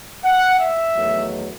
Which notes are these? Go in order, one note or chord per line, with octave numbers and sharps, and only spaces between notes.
F#5
E5
E2 D#3 F#3 A3